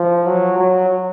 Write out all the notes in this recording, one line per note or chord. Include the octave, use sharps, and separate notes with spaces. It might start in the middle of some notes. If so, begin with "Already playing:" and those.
Already playing: F3
F#3
F#3